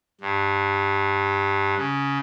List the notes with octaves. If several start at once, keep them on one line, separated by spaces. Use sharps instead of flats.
G2
C#3